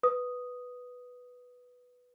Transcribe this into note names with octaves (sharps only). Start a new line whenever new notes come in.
B4 D#6